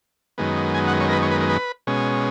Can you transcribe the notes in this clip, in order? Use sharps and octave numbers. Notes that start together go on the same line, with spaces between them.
F#2 D#3 G#3 B3
G#5
F#5
C#5
A#4
B4
C#5
B4
A#4
B4
B2 G#3 C#4